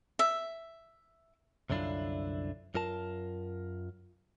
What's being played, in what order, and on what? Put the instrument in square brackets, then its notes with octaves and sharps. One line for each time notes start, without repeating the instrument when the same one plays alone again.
[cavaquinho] E5
[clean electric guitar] C2 F#2 D3 D4 E4 F4
F#2 F4 A#4 A5